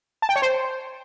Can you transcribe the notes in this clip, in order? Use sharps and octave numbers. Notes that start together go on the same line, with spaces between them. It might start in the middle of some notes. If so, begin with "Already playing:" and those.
A5
G5
C#5
C5